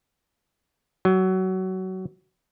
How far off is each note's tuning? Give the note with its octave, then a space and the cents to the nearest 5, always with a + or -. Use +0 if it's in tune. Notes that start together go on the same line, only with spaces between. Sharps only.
F#3 +20